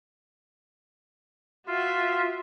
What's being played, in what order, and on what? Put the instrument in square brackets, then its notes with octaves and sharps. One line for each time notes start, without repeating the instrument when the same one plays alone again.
[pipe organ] F4 [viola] F#4 E5